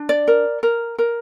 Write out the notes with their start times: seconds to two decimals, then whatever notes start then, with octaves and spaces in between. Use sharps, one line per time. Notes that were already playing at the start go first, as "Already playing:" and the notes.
Already playing: D4
0.09 D5
0.28 A#4
0.63 A#4
0.98 A#4